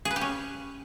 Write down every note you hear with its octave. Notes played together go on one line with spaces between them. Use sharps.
G#4
B4
G4
C#4